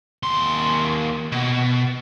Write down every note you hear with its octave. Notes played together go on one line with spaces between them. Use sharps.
D#2 C6
B2